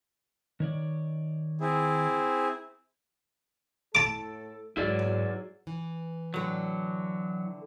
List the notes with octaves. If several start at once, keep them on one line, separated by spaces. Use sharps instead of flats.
D#3 C#5 D5
C4 E4 G#4
A2 A4 A5 D6
G#2 F#3 E4 G#4 D5
E3
A2 D3 F#3